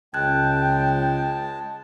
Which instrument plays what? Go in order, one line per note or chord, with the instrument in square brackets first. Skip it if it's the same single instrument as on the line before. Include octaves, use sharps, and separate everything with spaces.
[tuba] C#2 [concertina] G#3 A5 [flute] G5 [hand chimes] F#6 G#6